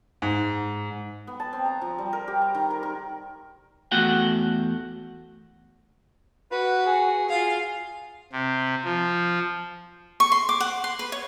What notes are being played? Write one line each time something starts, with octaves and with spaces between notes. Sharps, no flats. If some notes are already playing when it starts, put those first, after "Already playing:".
G#2
B3
A5
C4
A#5
F3
G3
A#4
G4
A#5
D#3
A#4
A#4
E2 A3 F#4 F#5 G5
F#4 B4
G#4
F4 G#4 F5
C3
F3
C#6
C6
D6
F#5
C6
B4
C#5